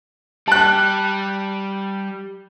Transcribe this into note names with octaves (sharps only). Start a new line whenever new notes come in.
G3 A5 F#6